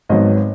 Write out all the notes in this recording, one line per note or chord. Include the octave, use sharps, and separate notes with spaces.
G#1 G#2 F#3 B3 D#5